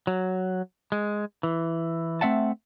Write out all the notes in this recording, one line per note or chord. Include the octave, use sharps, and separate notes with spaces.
F#3
G#3
E3
A3 C4 E5 F#5 A5